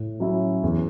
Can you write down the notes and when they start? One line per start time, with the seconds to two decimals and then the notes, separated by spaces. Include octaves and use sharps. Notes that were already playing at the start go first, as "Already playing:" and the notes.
Already playing: A2
0.20 F#3 C#4 E4
0.63 E2